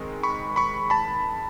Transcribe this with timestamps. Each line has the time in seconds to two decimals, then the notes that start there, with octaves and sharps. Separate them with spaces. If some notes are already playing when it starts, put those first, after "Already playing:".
Already playing: D#3 G#3 C4
0.23 B5 C#6
0.56 B5 C#6
0.90 A5 B5